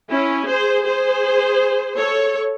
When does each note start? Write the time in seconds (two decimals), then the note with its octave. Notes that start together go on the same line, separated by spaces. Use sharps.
0.11 C#4 E4
0.48 G#4 C5
0.85 G#4 C5
1.97 A4 C#5